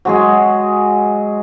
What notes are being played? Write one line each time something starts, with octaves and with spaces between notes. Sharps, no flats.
F#3 G#3 G#4